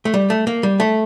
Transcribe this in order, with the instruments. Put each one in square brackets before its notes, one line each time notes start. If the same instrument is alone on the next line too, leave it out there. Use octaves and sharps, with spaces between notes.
[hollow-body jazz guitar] A3
G3
A3
A#3
G3
A3